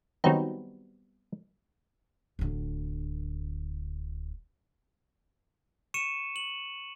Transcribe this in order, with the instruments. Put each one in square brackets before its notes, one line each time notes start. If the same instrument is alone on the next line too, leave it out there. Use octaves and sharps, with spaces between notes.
[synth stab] D#3 F#3 D#4 [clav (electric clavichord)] G3 B3 C4
[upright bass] D1 D3
[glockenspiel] C#6 C#7 D#7 E7
F#7